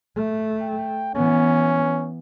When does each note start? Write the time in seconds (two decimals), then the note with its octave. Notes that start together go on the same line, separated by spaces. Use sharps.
0.16 A3
0.62 G5
1.15 E3 B3 C#4